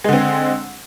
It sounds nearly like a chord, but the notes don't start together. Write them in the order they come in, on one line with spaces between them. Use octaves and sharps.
G#3 D3 C4